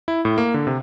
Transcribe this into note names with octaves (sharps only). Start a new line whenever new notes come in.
E4
A2
A#3
D3
C3